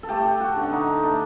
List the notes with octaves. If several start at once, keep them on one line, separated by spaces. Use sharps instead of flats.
A4
A3 G4
F#4
D3
D4
D#4
A3 D4